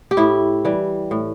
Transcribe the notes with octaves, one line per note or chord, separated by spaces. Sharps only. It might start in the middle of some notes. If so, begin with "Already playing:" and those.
G4
A2 E4
E3 G3
A2